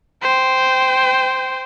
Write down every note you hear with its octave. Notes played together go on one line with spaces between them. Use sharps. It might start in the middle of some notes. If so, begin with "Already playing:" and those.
C5 G5